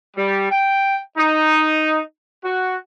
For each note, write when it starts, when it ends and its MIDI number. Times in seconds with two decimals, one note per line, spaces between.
0.16 0.48 55
0.50 0.98 79
1.18 1.99 63
2.45 2.77 66